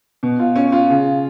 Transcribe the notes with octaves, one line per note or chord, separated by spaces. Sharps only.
B2
F4
C#4
F4
C#3